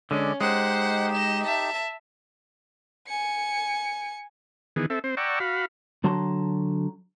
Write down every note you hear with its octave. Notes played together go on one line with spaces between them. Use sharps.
D3 G#3 C#4 D5
G#3 D#4 G4 C5 F#5
D#5 E7
E5 A5
G#5 C#7
D#3 E3 B3 G#4
C4 A4 E5
C4 C5
D5 F#5 G5 A#5 C#6 E6
F#4 F5 B5
D3 F#3 F#4 A5 A#5 C6